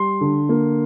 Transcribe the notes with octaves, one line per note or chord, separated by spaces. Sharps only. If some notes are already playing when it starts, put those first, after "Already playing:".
Already playing: G3 C6
D3
A#3